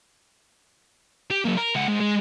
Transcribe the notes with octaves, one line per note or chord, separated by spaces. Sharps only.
G4
F#3 A#3
A#4
C#2 F#5
G#2
G#3